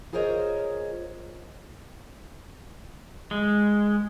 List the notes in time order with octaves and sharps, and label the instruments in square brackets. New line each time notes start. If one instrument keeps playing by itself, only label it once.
[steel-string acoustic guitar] F4 G#4 A#4 C5 C#5 D#5
[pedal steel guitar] G#3